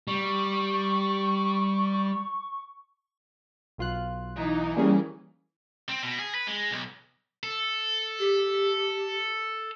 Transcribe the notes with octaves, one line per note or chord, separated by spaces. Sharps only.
G3 C#6
B1 F4 F#6
E3 D#4
G3 A#3 C#4 G#4
C4
B2
G#4
B4
G#3
B1
A4
G4